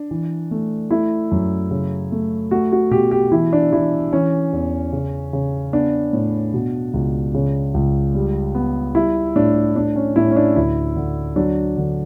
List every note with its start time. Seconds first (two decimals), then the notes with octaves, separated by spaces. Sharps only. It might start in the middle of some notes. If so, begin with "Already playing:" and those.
Already playing: D4
0.11 E3
0.51 A3
0.91 A3 E4
1.32 F#2
1.71 C#3
2.12 A3
2.51 A3 F#4
2.72 F#4
2.91 B2 G4
3.11 G4
3.31 E3 E4
3.53 D4
3.72 E3 E4
4.13 E3 C#4
4.53 E2
4.93 C#3
5.33 C#3
5.73 B3 D4
6.13 A2
6.54 B2
6.94 C#2
7.34 C#3
7.74 C#2
8.14 G3
8.55 B3
8.95 G3 E4
9.36 A2 D4
9.76 A2 D4
9.96 C#4
10.16 A2 E4
10.31 C#4
10.36 D4
10.56 D2 E4
10.96 D3
11.36 F#3 D4
11.77 D3